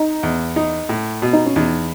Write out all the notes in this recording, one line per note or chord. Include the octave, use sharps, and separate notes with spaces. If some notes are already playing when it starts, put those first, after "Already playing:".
Already playing: D#4
E2
D#4
A2
B2
D#4
C#4
E2 D#4